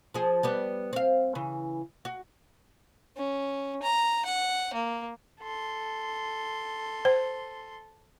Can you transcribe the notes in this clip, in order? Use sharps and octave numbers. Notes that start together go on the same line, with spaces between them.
F3 G#4
G3 B3 G4
C4 F5
C#3 E3
F#4
C#4
A#5
F#5
A#3
A4 C6
C5